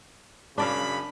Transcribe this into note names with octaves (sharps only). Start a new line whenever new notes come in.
F#2 C#3 D4 D5 F5 B5